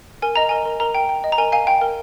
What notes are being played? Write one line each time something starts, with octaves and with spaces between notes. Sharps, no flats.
A#4 G#5
D#5 A#5
A#4 G#5
A#4
A#4 A#5
G5
G5
D#5
A#5
A#4 G#5
F5 G#5
F5 G5
A#4